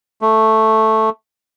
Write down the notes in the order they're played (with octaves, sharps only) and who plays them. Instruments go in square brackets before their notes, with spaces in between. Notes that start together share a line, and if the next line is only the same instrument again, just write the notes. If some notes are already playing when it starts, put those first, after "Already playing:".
[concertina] A3